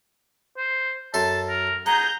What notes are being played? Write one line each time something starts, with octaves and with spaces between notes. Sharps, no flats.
C5
F#2 A4 A5 C6
A#4
G#4 F#5 A#5 G6